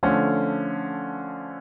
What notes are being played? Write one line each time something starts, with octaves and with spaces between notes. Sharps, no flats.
D3 F3 A3 C#4